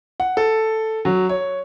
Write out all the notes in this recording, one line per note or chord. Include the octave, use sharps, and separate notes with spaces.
F#5
A4
F#3
C#5